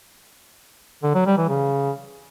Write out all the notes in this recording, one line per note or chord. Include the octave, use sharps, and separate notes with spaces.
D3
F#3
G3
E3
C#3